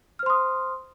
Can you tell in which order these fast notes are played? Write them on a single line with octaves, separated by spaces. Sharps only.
F6 C5 C6 D#6